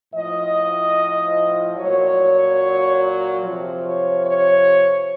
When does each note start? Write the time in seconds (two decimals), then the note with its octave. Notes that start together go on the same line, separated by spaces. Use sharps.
0.12 A2 F3 D#5
1.77 F#3 C#5
1.82 A#2
3.41 C3 F3
3.83 C#5
4.25 C#5